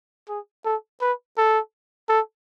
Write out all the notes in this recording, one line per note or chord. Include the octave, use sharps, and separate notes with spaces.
G#4
A4
B4
A4
A4